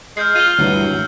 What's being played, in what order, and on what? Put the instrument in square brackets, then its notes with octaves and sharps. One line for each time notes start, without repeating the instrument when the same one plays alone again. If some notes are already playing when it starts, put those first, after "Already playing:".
[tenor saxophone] G#3 [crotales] F6 G6 C7
[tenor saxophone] F4 [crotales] D#7 G7
[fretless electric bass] D2 G2 E3 [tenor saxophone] F#3
[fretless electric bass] G#1